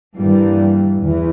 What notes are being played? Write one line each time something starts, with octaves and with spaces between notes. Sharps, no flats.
G2 E3 G3 A#3
E2 E3